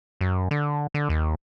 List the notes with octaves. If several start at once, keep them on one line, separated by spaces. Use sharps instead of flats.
F#2
D3
D3
D#2